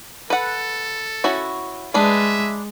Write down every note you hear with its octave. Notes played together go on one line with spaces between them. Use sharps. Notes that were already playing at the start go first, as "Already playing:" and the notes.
A4 B4 F#5
C#4 E4 F#4
G#3 D4 G#4 B4 E5